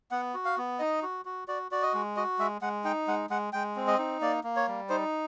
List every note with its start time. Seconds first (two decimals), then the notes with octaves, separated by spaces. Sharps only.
0.11 B3 F#5
0.34 F#4
0.45 F5
0.58 B3
0.79 D#4 D#5
1.03 F#4
1.25 F#4
1.48 F#4 D5
1.71 F#4 D5
1.83 D#5
1.94 G#3
2.17 F#4 D#5
2.39 G#3 E5
2.62 G#3 F#5
2.84 D#4 G5
3.07 G#3 F#5
3.30 G#3 F#5
3.53 G#3 G5
3.76 C4
3.87 D#5
3.98 D#4
4.21 A#3 D5
4.44 A#3
4.56 C#5
4.67 G3
4.89 D#4 C5